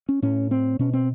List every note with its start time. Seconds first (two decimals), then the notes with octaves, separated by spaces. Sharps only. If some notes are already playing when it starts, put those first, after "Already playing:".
0.09 C#4
0.22 A2 C#4
0.51 C4
0.79 B2 C#4
0.93 C4